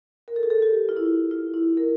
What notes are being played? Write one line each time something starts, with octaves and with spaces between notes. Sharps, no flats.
A#4
A4
G#4
A4
G4
F4
E4
F4
E4
A#4